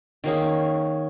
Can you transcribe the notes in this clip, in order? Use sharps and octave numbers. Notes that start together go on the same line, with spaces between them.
D#3 A#3 C#4 G#4